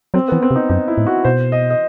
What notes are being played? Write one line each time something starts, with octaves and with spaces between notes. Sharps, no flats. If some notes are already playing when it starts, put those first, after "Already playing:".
F#3 C4
E3 B3
C4
C3
D#4
F#2 D#4
E4
A2
F#4
B2 C5
D#5
D#5